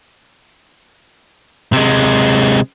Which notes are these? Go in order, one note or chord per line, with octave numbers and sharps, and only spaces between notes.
C3 G#3